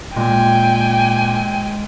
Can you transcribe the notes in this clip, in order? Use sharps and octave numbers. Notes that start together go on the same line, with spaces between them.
A#2 G#3 G5 G#5